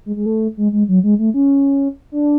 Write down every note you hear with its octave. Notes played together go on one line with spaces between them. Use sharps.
G#3
G#3
A3
G#3
G#3
F#3
G#3
A3
C#4
D4